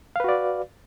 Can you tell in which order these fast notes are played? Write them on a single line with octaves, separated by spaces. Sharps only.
F5 B4 F#4 D5